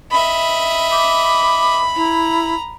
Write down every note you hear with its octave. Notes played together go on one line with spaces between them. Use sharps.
D#5 E5 B5
D6
E4 A#5